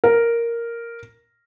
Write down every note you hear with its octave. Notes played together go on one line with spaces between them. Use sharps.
A#4